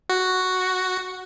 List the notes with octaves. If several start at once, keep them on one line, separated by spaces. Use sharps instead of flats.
F#4